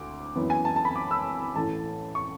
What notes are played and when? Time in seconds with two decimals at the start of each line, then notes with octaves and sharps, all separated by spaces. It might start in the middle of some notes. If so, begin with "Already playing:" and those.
Already playing: D2 D6
0.36 F#2 E3 B3
0.50 G#5
0.65 A5
0.76 A5
0.85 B5
0.96 D6
1.11 E6
1.56 A1 A2 E3 A3 A5
2.15 C#6